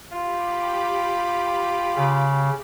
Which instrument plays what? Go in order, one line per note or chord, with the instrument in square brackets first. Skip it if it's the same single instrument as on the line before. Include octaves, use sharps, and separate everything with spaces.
[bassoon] F4 [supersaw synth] G4 B5 D6
[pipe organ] C#3